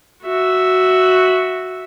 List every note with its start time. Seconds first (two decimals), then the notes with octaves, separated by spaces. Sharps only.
0.24 F#4 E5